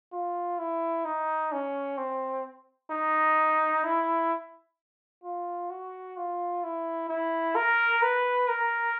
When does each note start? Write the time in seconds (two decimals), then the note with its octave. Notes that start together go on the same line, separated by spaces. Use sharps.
0.12 F4
0.59 E4
1.05 D#4
1.52 C#4
1.98 C4
2.91 D#4
3.84 E4
5.24 F4
5.70 F#4
6.17 F4
6.64 E4
7.09 E4
7.56 A#4
8.02 B4
8.49 A#4